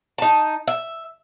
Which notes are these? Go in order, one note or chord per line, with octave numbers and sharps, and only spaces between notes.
D#4 A5
E5